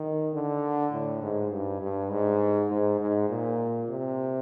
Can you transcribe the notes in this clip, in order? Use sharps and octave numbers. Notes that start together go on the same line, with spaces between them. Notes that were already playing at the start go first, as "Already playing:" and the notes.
Already playing: D#3
D3
A2
G#2
G2
G2
G#2
G#2
G#2
A#2
C3